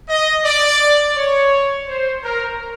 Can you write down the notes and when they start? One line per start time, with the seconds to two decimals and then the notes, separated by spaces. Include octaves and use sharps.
0.09 D#5
0.45 D5
1.17 C#5
1.88 C5
2.24 A#4